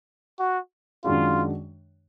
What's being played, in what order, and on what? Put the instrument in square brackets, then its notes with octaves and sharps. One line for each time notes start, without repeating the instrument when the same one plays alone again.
[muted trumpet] F#4
[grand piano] F#2 D#3 G#3 D4 F#4 [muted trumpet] F4